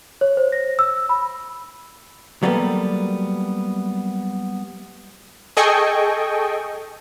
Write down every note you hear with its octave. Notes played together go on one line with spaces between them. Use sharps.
C#5
C5
A#6
E6
B5
F#3 G3 A#3 B3 A4
G#4 A4 D#5 G5 G#5 C#6